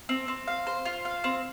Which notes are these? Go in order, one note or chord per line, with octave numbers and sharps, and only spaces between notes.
C4
C4
F5
C5
F4
F5
C4